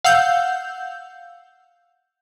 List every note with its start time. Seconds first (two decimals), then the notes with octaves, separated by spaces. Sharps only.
0.04 F5 F#5 E6 G6